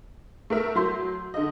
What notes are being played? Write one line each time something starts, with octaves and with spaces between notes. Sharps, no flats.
A3 A#4 E5
F#3 C6 G6
D3 D#5